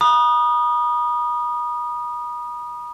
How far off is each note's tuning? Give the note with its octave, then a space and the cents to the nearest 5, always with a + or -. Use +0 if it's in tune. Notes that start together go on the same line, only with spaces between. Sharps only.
B5 -45 D#6 -20